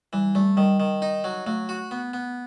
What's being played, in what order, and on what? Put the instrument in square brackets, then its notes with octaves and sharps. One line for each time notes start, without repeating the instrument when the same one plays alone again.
[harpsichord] E3 [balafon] G3
[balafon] G3 [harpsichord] A3
[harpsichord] D#3 [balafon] G3
[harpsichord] D#3
D#4
F#3
[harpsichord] F#3 [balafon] A3
[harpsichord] F#4
B3
B3